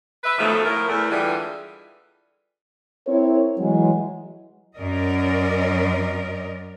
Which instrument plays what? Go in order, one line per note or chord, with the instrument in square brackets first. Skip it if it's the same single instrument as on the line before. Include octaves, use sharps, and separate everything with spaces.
[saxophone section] B4 E5
B2 D#3 F3 F#3 A3
A2 F3 A#4
E2 A3
D3 E3 G3 G#3 F4 G#4
[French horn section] C4 E4 A#4 C#5
E3 F#3 G#3
[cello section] F#2 C#4 A#4 D5 D#5